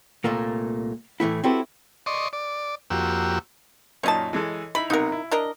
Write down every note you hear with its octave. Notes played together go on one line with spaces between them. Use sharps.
C2 A#2 A3 A#3
A2 E3 A3 E4
C4 E4 F#4 G4 A4 B4
D5 D#5 C6 C#6
D5
F2 A#3 F#4 G4 E6
F#2 A#2 D#4 C#5 D#5 A5
E3 G#3 A4
D#4 E4 B5
B1 C3 D#4 A#4 F#5
E4
D4 A#4 D#5